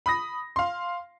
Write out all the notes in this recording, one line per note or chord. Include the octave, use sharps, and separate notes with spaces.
B5 D#6 A#6
F5 C6